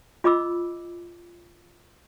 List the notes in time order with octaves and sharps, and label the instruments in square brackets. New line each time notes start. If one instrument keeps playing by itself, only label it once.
[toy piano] F4 D#5 B5 D6 E6